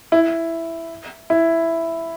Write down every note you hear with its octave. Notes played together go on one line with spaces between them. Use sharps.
E4
E4